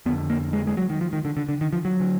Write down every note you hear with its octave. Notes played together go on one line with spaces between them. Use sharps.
F2 D3 B3
A#3
G#3
G#3
F#3
D#3
F3
D#3
D3
D3
D3
D#3
F3
F#3
D3